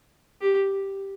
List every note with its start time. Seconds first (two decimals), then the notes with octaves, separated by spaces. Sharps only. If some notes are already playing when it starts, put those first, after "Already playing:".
0.42 G4